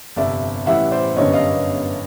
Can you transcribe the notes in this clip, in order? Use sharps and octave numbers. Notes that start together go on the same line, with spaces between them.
G1 F2 C3 D5 E5
A1 A2 E3 G3 E5 F#5
C5 D5
G1 F#2 D3 G3 B3 C#5 D#5
D#5 F5